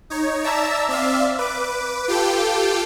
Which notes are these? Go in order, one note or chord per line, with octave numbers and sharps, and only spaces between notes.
D#4 C#5
D5 E5 A5 A#5 E6
C4 D5 E5 F5
B4 D6
F4 G4 A4 G5